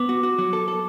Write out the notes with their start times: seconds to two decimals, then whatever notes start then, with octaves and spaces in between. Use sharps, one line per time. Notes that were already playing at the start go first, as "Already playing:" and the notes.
Already playing: B3 D6
0.09 F#4
0.23 F#4
0.38 F#3
0.53 A4
0.68 A4